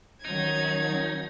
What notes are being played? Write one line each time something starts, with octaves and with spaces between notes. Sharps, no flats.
D#3 F#3 C#4 D#4 G#6